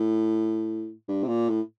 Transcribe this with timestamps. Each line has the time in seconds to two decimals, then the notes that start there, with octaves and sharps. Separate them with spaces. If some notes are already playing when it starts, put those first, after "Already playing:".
Already playing: A2
1.08 G2
1.24 C3
1.28 A#2
1.49 A2